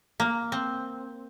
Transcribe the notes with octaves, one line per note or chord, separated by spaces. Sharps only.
A#3
C4